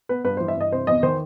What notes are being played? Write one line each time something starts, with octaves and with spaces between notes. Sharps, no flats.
B3 B4
G2 B4
E3 C5
E5
G2 D#5
C3 C5
E2 D#5
D#3 C5